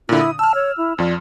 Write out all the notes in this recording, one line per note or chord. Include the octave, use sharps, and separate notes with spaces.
A#2 D3 E4
D#6
A5 E6 F6
C#5
E4
F2 F3 D5